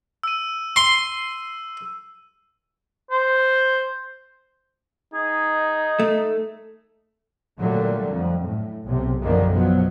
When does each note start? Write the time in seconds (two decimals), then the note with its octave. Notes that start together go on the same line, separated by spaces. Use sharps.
0.23 E6 D#7
0.76 C6
3.11 C5
5.14 D#4 G#4
5.99 A3
7.59 A#2 D3 F#3 G3 A3
8.09 F2
8.44 A2
8.84 B1 C3
9.20 A#1 F#2 D3 D#3 F3 A#3
9.53 B2 F3 F#3 B3